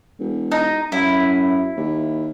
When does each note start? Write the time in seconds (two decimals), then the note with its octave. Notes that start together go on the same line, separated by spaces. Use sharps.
0.19 E1
0.52 D#4
0.92 F#2 E4
1.77 D#2